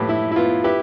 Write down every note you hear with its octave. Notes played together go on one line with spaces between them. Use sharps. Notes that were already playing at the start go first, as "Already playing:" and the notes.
Already playing: A2 F3 G4 B4
E4
E4
B3 F4
E4 G4 B4